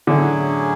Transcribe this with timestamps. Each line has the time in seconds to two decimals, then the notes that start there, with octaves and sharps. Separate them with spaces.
0.07 A2 D3 F#3 C#4 E4 G#4